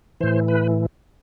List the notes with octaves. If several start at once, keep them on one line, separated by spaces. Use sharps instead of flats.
A2 E3 C5
B4